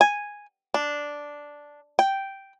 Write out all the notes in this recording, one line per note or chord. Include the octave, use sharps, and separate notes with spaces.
G#5
D4
G5